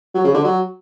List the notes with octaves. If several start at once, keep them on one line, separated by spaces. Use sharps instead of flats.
F#3
C#3
D3
F#3